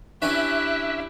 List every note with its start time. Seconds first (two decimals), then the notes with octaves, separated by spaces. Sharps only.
0.22 C#4 D4 E4 G4 B4 E5 F#6